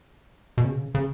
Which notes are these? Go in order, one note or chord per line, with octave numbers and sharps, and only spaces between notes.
B2
C#3
C#3